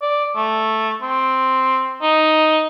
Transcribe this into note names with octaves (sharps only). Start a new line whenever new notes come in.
D5
A3
C4
D#4